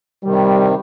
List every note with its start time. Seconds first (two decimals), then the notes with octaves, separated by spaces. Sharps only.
0.25 C3 D#3 G3